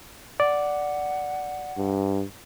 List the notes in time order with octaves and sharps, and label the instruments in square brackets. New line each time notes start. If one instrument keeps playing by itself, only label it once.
[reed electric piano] D5 [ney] F#5
[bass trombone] G2